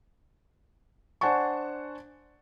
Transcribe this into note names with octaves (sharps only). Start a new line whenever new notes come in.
D4 C5 F#5 G#5 A5 C#6